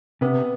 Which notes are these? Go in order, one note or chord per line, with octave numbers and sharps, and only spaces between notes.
C3 B3